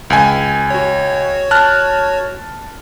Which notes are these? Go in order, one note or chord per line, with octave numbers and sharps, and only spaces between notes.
C#2 G#5
F#4 C#5
A5 F6 F#6